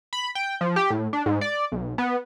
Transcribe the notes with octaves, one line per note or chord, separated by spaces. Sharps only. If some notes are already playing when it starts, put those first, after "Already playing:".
B5
G5
F3
G4
A2
D4
G#2
D5
B1
B3